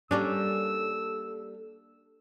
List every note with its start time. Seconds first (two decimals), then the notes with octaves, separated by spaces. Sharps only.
0.11 G3 A#3 C#4 D4 A4 E6